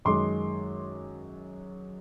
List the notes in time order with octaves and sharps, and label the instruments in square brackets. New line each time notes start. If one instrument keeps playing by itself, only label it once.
[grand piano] F#2 D#3 G#3 C6 D6